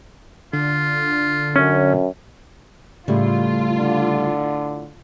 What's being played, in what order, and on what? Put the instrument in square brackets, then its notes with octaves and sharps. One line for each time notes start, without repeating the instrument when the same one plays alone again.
[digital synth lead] D3 [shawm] F4
[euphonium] F#2 [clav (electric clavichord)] C#4
[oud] A2 [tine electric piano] C#3 G3 A3 [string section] F4
[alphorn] D3